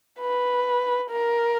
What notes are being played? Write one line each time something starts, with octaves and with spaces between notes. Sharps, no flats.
B4
A#4